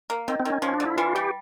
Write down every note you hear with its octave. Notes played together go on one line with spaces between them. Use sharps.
A#3
D#3 C4
C4
D#3 C#4
F3 C#4
D4
D3
E4
E3 F4
G3 G4